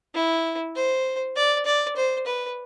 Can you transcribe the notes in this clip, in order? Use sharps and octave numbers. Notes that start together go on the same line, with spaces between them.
E4
C5
D5
D5
C5
B4